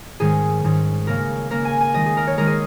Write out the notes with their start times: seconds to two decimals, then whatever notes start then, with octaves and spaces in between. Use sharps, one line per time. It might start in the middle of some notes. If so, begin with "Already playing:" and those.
0.20 G#2 D#3 G#3 C#4 G#4
0.64 G#2 D#3 G#3 C#4
1.07 C#3 A#3 C#4 A#4
1.50 C#3 A#3 C#4 A#4
1.65 G#5
1.81 G#5
1.94 D#3 G#3 D#4 D#5
2.06 G#4
2.17 A#4
2.27 C#5
2.38 D#3 G#3 D#4 A#4
2.47 G#4